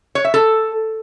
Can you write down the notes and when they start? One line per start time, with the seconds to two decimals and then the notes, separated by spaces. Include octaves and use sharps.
0.15 C#5
0.25 E5
0.34 A4